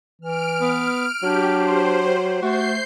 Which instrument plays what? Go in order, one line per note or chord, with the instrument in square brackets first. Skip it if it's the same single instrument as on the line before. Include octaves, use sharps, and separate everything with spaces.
[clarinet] E3 [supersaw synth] F6 D7
[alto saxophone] B3
[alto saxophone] F#3 [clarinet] D4 [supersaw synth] G4
[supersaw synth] C5
[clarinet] A3 [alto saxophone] F#4 [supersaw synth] G6 C7